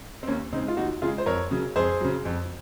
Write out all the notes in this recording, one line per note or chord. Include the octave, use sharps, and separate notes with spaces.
C4
D#2 A#3 C#4
C#3 G#3 C4 D#4
F4
D#2 D#4 F#4
C#3 G#3 F4 G#4
C5
F2 A#4 C#5
C#3 F#3
F2 G#4 C5
C#3 F#3
F2